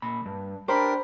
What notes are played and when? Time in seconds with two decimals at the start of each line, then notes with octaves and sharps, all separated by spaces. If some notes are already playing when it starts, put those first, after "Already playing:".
0.02 A#2 B5
0.26 G2
0.68 D4 G4 A#4 C5 B5